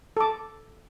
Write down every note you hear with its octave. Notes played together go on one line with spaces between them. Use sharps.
A4 D6